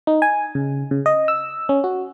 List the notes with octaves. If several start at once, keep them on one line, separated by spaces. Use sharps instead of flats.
D#4
G#5
C#3
C#3
D#5
E6
C#4
F#4